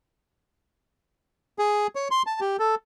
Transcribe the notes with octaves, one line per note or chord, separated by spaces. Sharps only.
G#4
C#5
C6
A5
G4
A4